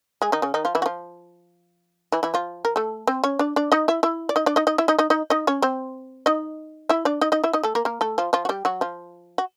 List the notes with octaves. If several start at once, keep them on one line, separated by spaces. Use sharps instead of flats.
G#3 G#4
D#3 D#4
C#3 C#4
D#3 D#4
F3 F4
E3 E4
F#4
F3 F4
E3 E4
E3 E4
F3 F4
A#4
A3 A4
C4 C5
C#4 C#5
D4 D5
D4 D5
D#4 D#5
E4 E5
E4 E5
D5
D#4 D#5
D4 D5
D#4 D#5
D#4 D#5
E4 E5
D#4 D#5
D#4 D#5
D#4 D#5
D#4 D#5
C#4 C#5
C4 C5
D#4 D#5
E4 E5
D4 D5
D#4 D#5
D#4 D#5
E4 E5
D#4 D#5
A3 A4
A#3 A#4
A#3 A#4
A3 A4
F3 F4
F3 F4
F#4
G3 G4
F#3 F#4
F3 F4
F#4